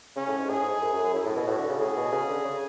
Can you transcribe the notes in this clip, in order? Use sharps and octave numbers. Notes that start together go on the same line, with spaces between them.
C#3 C#4
A2
G#2
A2 G#4
G#2
F#2
F#2
F#2
F#2 E4
A2
B2
A2 F#4
D3
C#3
A2 G#4
B2
C#3
D3
C#3